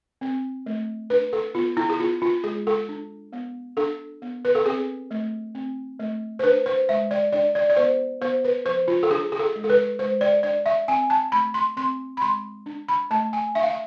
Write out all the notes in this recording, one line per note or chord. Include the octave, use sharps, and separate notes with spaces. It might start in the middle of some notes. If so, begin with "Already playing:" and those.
C4
A3
D4 B4
A4
B3 F4
E4
G#4
B3 F4
F4
G#3 G#4
A4
D4
B3
D4 A4
B3
B4
A4
C4 G#4
A3
C4
A3
C5
D4 B4
C5
G#3 E5
D5
D4 D5
D5
D5
B3 C5
B3 C5
B4
F3 C5
F4
A4
D4 G#4
G#4
A4
G#3
A4
B4
G#3 C5
D5
D4 D5
E5
C4 G#5
A5
A3 B5
C6
C4 C6
B5
G#3 C6
D4
B5
A3 A5
G#5
D4 E5
F5
E5